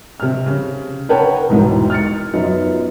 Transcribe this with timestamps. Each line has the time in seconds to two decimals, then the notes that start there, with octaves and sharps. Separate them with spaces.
0.20 C3 F6
0.46 C#3
1.09 A#4 B4 C#5 F#5 G5 A5
1.49 E1 C2 G#2 E3
1.90 F6 A6 C#7
2.34 F#2 B3 D#4 F4